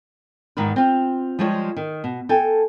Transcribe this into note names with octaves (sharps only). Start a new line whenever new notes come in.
E2 G#2 D#3 B3 A#4 B4
C4 F4
F3 G3 G#3 F4 A4 C#5
D#3
B2
A4 G5 G#5